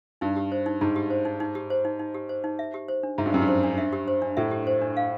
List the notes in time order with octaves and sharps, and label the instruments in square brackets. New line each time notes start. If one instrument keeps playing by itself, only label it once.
[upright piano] G2 [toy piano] D#4
[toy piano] G4
C5
D#4
[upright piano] G#2 [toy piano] D#4
[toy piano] G4
C5
D#4
D#4
G4
C5
D#4
D#4
G4
C5
D#4
E5
G4
C5
D4
[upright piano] G#2 [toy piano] E5
[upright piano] G2
[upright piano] F#2 [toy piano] G4
[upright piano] G2
[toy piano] C5
D4
E5
G4
C5
D4
[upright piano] A2 [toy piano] E5
[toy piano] G4
C5
D4
F5